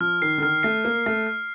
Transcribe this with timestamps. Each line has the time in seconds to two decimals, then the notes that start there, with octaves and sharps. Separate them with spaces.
0.01 F3 F6
0.22 D#3 C7
0.38 D3
0.42 D#3 F6
0.63 A3 C7
0.84 A#3 F6
1.06 A3 F6
1.27 F6